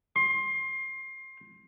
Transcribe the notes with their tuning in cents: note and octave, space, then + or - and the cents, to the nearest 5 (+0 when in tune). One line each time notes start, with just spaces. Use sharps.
C6 +25